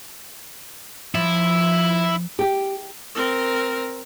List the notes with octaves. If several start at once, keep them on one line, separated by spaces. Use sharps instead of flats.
F3 E4
G4
C4 A#4